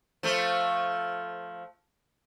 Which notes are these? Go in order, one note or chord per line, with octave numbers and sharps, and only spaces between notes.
F3 A3